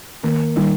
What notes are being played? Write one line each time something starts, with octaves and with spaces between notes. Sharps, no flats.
D#3 A#3
D#3 G3 A#3